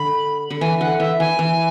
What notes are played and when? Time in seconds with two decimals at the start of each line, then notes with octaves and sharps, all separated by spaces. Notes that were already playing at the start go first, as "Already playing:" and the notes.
Already playing: D3 B5
0.50 D3
0.61 E3 G#5
0.80 D3 F#5
1.00 E3 E5
1.19 E3 G#5
1.39 E3